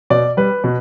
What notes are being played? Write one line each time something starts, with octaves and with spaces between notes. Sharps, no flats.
B2 D5
G3 B4
B2